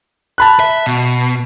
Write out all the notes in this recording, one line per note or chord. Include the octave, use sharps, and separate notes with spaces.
A5 B5 F#6
E5
B2